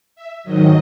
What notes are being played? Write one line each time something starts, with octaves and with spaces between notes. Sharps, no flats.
E5
G#2 D#3 F#3 D#5